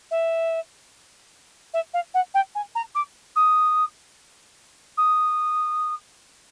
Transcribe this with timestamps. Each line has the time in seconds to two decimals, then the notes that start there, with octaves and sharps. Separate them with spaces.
0.11 E5
1.74 E5
1.94 F5
2.14 F#5
2.34 G5
2.55 G#5
2.75 A#5
2.95 D6
3.36 D#6
4.97 D#6